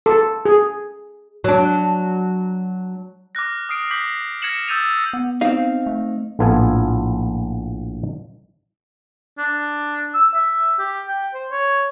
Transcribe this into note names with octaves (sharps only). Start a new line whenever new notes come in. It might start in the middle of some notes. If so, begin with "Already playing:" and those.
A4
G#4
F#3 D4
D6 F6 F#6 A#6
D#6 F6 C7 D7
D6 G6 B6 C7 F#7
F6 G#6 A#6 C#7 E7 F#7
D#6 E6 G6 A6 D#7 F7
B3
C4 D#4 F5
A3
A#1 A2 B3 F4 A4 G#5
D4
E6
E5
G4
G5
C5
C#5